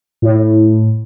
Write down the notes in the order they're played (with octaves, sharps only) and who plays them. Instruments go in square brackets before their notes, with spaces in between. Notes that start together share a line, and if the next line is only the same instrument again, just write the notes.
[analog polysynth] A2